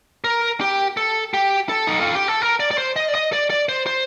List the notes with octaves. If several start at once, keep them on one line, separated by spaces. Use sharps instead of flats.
A#4
G4
A4
G4
A4
D#4
F4
G4
A4
A#4
D5
D5
C5
D#5
D5
D#5
D5
D5
C5
C5